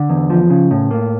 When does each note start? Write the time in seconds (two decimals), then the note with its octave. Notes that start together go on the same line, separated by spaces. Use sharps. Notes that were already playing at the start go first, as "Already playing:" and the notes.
Already playing: D3
0.09 E2
0.30 F3
0.50 C#3
0.71 A2
0.91 A#3